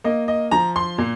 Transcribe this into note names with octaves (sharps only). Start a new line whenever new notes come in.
A#3 D#5
D#5
F3 A#5
C6
A#2